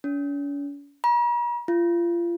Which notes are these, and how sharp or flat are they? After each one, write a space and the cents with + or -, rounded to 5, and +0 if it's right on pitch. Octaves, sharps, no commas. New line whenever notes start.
C#4 +45
A#5 +45
F4 -30